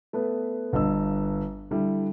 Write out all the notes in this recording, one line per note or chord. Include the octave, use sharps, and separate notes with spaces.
A3 B3 B4
G1 G2 D#5 E6
D3 G3 E4